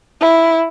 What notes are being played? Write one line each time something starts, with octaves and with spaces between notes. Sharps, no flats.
E4